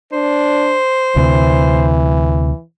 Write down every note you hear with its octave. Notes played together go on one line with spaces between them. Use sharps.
D4 C5
D2 C3 E3